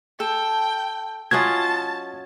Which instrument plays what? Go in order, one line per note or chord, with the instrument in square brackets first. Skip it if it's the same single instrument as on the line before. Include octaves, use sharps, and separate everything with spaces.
[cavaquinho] A4 [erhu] G5
[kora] F#3 C#4 F4 [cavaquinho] D#5 F#5 [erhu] A5 [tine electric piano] G#6